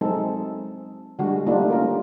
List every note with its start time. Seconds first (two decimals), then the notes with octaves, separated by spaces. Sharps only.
0.01 F#3 G#3 C4 D#4 A4
1.19 D3 G3 G#3 F#4
1.46 G3 A3 A#3 D4 D#4 F4
1.70 C#4 F4 A#4